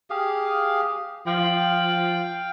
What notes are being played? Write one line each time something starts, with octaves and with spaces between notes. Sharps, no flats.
G4 G#4 F5
F3 F5 G5